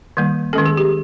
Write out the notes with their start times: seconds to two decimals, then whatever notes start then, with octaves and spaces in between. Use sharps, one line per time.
0.17 D#3 G3 A#3
0.53 D#3 G#3 C#4 A4
0.66 G#4
0.77 G4